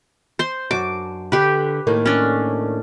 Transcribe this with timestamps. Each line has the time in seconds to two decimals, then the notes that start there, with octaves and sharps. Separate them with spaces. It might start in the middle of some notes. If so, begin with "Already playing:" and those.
0.39 C5 C6
0.71 F#2 D4 F#4 D6
1.32 D3 G4 B4
1.87 A2 D#3 A#3
2.06 C#4 D4